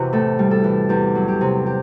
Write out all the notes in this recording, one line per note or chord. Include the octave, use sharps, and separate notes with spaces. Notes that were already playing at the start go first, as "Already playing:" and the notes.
Already playing: E2 C3 E3 C4 E4 F#4
A2 A4
G3
A4
E3
E2 G4
F#3
G4
C3
G4